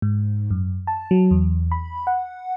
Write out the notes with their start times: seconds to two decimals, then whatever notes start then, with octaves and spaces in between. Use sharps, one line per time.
0.02 G#2
0.51 F#2
0.87 A5
1.11 F#3
1.31 E2
1.72 B5
2.07 F#5